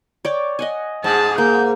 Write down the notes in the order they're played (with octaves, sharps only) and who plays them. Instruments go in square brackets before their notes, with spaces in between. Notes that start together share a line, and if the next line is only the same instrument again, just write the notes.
[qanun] C#5 D5 G5
D#5 F#5 G#5
[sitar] G#2 [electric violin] G#4 A5
[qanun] A#3 [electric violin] G6